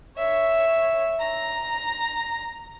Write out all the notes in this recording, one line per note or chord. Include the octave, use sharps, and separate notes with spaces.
C#5 E5
A#5